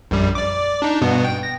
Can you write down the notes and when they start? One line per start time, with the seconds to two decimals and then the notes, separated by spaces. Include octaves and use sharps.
0.11 A#1 F#2 G3
0.35 D5 D6
0.82 D4 D#4
1.01 G2 B2 B3
1.25 G5
1.43 A#6